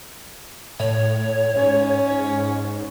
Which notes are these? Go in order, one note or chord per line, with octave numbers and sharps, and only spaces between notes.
A2 C#5
G#2 C#4